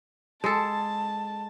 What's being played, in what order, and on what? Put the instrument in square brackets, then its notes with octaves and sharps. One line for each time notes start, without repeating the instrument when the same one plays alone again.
[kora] G#3 A4 [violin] A5